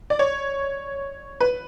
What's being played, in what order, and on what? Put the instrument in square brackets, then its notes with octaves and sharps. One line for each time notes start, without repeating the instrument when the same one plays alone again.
[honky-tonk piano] D5
C#5
B4